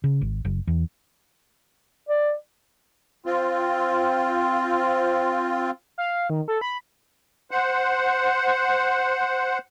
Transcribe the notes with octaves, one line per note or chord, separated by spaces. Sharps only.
C#3
G#1
F#1
E2
D5
C4 F4
F5
D#3
A4
B5
C5 F#5